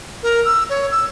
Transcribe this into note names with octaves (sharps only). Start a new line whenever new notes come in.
A#4
E6
C#5
E6